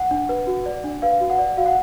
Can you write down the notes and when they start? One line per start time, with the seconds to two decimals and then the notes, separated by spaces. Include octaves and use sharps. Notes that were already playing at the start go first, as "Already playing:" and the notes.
Already playing: F#5
0.11 D4
0.29 B4
0.47 F#4
0.66 D5
0.84 D4
1.02 B4 F5
1.21 F#4
1.30 F#5
1.39 D5
1.57 F#4 F5
1.66 F#5